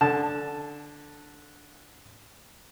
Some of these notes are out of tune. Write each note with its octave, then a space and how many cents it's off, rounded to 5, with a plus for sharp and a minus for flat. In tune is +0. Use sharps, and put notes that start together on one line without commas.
D3 +0 A5 +0